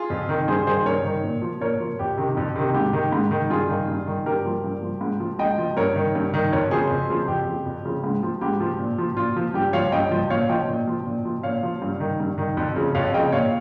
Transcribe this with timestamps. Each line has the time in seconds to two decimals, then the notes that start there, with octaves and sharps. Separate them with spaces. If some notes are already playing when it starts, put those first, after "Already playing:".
Already playing: F4 G#4
0.10 F2
0.29 D#3
0.48 G2 G#4 C5
0.66 D#3 G#4 C5
0.77 C5
0.86 G2 A#4 C#5
1.04 D#3
1.24 A#2
1.42 F3
1.61 A#2 A#4 C#5
1.80 F3
1.99 F2 G4
2.17 C3 D#3
2.37 F2
2.55 C3 D#3
2.74 G#2 G4
2.93 D#3
3.12 G#2
3.31 D#3
3.50 G2 F4 G#4
3.69 D#3
3.88 G2
4.07 D#3
4.26 G2 G4 A#4
4.45 F3
4.64 G2
4.82 F3
5.01 G#2
5.20 F3
5.39 G#2 D#5 G5
5.58 F3
5.77 G2 A#4 C#5
5.96 D#3
6.15 G2
6.34 D#3
6.53 F2 A#4 C#5
6.71 C#3 F3 G#4 C5
6.90 F2
7.10 C#3 F3
7.28 F2 G4
7.47 C#3 F3
7.66 F2
7.85 C#3 F3
8.04 G#2
8.23 F3
8.41 G#2 G4
8.61 F3
8.79 A#2
8.98 F3
9.17 A#2 F4
9.36 F3
9.54 G2 G4
9.73 F3 C#5 F5
9.92 G2 D#5 G5
10.11 F3
10.30 A#2 C#5 F5
10.49 F3 D#5 G5
10.69 A#2
10.87 F3
11.06 A#2
11.25 F3
11.43 A#2 C#5 F5
11.63 F3
11.82 G2
12.00 D#3
12.20 G2
12.38 D#3
12.57 F2
12.76 C#3 F3
12.95 F2 C#5 F5
13.14 C#3 F3 D#5 G5
13.32 A#2 C#5 F5